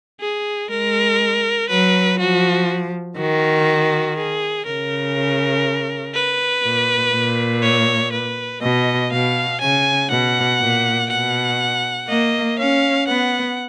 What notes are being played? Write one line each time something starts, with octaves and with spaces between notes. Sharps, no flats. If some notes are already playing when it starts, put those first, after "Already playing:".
G#4
G#3 A#4
F#3 B4
F3 F#4
D#3 F#4
G#4
C#3 A#4
B4
A#2
A#2
C#5
B4
B2 D#5
B2 F5
C#3 G#5
B2 F#5
A#2
B2 F#5
A#3 D#5
C#4 F5
B3 F#5